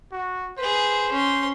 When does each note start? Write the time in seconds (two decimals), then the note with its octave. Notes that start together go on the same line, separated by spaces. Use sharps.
0.12 F#4
0.59 G#4 B4 C5
1.12 C#4 C6